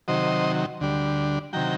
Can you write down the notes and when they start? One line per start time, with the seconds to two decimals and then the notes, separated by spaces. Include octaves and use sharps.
0.08 C3 D#3 F#3 C5 D#5
0.80 D2 D3 G3 D4
1.53 C3 D#3 F#3 G5 A#5